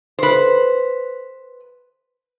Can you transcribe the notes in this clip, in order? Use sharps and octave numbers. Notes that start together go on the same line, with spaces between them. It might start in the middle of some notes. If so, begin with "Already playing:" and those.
B4 C5